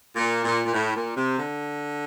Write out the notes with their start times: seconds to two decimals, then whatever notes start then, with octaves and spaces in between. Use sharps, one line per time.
0.16 A#2
0.44 A#2
0.65 A#2
0.74 A2
0.96 A#2
1.17 C3
1.39 D3